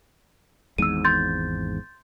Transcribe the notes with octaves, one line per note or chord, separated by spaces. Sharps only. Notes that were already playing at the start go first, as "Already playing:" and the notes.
G#1 E2 G#2 E6 D#7
C6 G6 A6